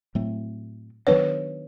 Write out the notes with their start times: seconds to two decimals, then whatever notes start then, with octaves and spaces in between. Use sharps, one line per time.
0.15 A2 F#3 A3 C4
1.07 D#3 F#3 B3 D4 B4 C#5